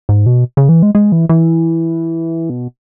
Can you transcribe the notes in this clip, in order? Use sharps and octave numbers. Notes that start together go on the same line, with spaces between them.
G#2
B2
C#3
E3
G#3
G#3
E3
E3
B2